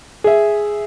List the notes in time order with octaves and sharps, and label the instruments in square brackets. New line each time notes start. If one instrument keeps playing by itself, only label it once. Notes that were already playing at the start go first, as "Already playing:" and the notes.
[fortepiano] G#4 E5